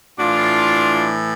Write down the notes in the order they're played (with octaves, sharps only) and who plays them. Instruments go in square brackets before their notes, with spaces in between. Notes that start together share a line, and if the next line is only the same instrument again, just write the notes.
[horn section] A2 E3 D4 F4